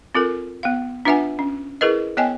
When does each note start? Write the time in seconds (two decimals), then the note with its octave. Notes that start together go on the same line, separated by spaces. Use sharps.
0.15 C4 F4 A4 A#4
0.63 B3 F5
1.05 D4 F4 B4 E5 F#5 G#5
1.39 C#4
1.81 E4 G#4 A#4 B4 D#5
2.17 B3 C#5 D#5 G5 G#5